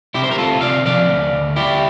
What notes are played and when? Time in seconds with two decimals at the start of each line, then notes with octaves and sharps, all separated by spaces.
0.14 C3 E4 G4
0.24 C5
0.31 A#4
0.38 D2 F4 A4
0.61 C3 D5 F5
0.85 F3 D5 F5
1.09 D2
1.33 D2
1.56 G3 E4 G4